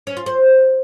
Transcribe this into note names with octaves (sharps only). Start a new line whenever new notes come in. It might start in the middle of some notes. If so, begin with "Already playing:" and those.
C#4
F4
C5